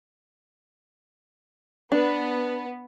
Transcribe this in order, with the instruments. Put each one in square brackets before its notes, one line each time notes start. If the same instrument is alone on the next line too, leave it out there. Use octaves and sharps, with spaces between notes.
[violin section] B3 [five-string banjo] D4